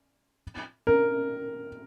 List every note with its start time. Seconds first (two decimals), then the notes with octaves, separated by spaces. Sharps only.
0.87 A#4